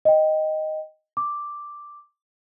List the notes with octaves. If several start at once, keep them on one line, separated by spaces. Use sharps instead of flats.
D#5 G5
D6